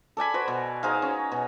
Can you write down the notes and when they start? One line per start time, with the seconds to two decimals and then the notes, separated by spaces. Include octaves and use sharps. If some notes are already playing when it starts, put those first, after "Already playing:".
0.17 A4 D5 G#5 B5
0.34 F#4 B4 C5
0.48 B2
0.83 D#4 G#4 C5 F5
1.02 C#4 F#4
1.32 B2